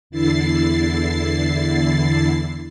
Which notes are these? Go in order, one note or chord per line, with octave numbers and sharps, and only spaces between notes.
E2 D3 E4 A6 C7